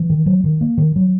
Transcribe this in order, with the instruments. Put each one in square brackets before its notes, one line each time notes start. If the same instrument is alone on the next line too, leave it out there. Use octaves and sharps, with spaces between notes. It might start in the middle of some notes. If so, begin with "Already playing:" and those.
Already playing: [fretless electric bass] E3
D#3
F#3
D#3
A#3
D#3
F#3